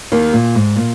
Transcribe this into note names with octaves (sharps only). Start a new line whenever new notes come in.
D#2 D#3
A#2
G#2
A#2